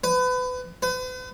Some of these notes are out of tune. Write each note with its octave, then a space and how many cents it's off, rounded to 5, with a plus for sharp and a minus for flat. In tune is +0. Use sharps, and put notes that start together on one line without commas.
B4 +30
B4 +45